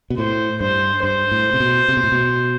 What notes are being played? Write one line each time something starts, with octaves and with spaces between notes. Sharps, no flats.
B2
A2 C5
G2 C5
G2 C5
A2
C3
B2
C3
B2
A2
B2